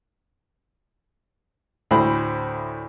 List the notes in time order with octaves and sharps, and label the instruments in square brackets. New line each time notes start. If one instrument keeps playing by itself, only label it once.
[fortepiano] D2 A2 C5 B5